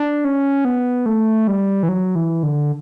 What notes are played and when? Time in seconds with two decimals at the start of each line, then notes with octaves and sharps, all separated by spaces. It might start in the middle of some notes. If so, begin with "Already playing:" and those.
Already playing: D4
0.25 C#4
0.65 B3
1.06 A3
1.47 G3
1.83 E3
1.89 F#3
2.15 E3
2.43 D3